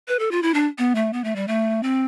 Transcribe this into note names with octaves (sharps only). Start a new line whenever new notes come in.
B4
A4
F4
E4
D4
B3
A3
B3
A3
G3
A3
C4